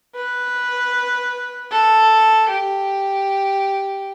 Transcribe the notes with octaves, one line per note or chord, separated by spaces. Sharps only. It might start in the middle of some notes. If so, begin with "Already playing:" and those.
B4
A4
G4